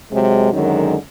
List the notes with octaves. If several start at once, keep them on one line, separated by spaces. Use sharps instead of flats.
C3 F#3 G#3
F#2 D3 D#3 F#3 G#3